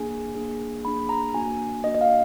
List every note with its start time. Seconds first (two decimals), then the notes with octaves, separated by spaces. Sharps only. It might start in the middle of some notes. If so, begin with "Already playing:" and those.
Already playing: A#3 D4 G#4 G#5
0.35 A#3 D4 G#4
0.85 A#3 D4 G#4 B5
1.09 A#5
1.34 A#3 D4 F#4 G#5
1.84 A#3 D4 F#4 D#5
1.95 D#5
2.01 F5